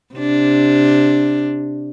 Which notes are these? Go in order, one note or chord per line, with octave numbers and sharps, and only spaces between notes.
C3 D4